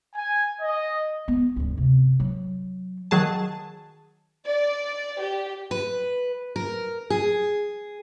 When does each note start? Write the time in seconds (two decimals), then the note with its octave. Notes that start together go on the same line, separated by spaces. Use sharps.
0.15 G#5
0.61 D#5
1.28 B3
1.56 D2 G2
1.77 C3
2.20 F#3
3.11 D#3 F#3 G#4 A5
4.46 D5
5.21 G4
5.71 B4
6.56 A#4
7.10 G#4